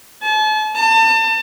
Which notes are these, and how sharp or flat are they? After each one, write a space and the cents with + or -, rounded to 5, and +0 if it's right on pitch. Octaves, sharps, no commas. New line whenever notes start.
A5 -40
A5 +35